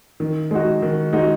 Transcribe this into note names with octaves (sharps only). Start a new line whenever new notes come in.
D#3
G#3 D#4 F#4
D#3
G#3 D#4 F#4